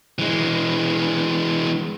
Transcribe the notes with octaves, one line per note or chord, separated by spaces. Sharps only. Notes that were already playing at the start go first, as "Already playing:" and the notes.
E3 G#3